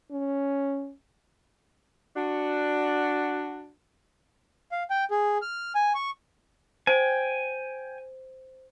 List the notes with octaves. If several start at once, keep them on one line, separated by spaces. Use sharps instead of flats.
C#4
D4 F#4
F5
G5
G#4
F6
G#5
C#6
C5 G5 G#5